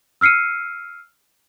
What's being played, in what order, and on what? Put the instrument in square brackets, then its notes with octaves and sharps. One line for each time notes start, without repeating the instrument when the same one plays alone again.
[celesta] E6 F6 C7 C#7 D#7